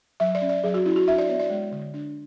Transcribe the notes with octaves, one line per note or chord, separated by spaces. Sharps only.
F#3 E5
D5
C#4
D5
F#3 G#4
F#4
C#4 E4
F#4
D4 E5
D5
B3 C#5
D5
G#3
D3
D4